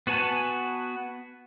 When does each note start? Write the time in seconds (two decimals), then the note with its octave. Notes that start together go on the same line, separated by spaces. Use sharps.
0.07 B3 F#4 B4 G#5 A5